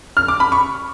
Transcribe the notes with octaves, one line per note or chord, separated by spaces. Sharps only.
F6
D6
B5
C#6